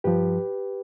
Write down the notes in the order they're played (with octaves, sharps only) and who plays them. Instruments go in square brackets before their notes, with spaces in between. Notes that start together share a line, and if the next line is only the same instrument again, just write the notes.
[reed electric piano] G2 F3 G4 B4